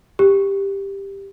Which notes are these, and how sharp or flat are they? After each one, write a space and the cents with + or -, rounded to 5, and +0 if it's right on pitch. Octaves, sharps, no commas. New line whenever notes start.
G4 +10